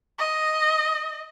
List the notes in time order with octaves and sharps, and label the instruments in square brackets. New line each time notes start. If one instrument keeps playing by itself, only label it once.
[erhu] D#5